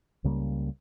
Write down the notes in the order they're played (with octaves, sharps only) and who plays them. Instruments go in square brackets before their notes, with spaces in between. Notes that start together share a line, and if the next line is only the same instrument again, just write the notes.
[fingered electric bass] C#2 C#3 G3 A#3